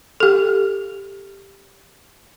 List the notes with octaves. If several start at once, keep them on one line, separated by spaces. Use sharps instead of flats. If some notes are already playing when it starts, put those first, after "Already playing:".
G4 A4